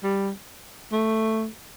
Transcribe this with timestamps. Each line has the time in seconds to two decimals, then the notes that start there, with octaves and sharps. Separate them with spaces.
0.03 G3
0.93 A3